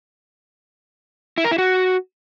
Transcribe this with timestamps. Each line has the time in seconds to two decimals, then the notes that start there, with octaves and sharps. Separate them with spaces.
1.38 E4
1.44 A#4
1.51 E4
1.58 F#4